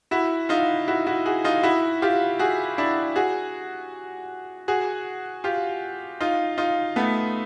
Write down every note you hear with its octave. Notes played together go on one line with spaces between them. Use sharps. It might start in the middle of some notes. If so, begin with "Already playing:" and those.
E4 F#4
D#4 F4
E4 F#4
E4 F#4
F#4 G#4
D#4 F4
E4 F#4
F4 G4
F#4 G#4
D4 E4
F#4 G#4
F#4 G#4
F4 G4
D#4 F4
D#4 F4
A3 B3